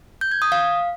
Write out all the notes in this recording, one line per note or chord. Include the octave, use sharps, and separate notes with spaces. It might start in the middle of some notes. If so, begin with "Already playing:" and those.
G6
G#6
D#6
F5